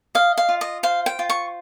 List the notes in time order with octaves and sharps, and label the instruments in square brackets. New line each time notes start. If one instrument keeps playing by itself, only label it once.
[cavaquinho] D#5 F5
F5
F4
D#5
C5 F5
G5
F4
C#6